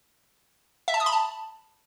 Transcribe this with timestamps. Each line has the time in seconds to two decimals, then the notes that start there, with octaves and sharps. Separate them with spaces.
0.88 E5
0.94 A5
1.00 D#6
1.06 B5
1.12 A5